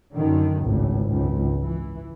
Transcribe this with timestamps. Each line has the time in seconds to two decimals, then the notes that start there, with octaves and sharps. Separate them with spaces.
0.15 F#2 D3 D#3
0.62 G#1 C#2 A2
1.06 G#1 C#2 F#2
1.62 E3